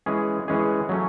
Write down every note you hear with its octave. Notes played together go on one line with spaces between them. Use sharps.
E3 G#3 C#4 G#4
E3 G#3 C#4 G#4
F#3 A3 C#4